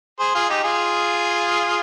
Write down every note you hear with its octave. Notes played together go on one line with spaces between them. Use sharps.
G#4 C5
F4 G#4
D#4 G4
F4 G#4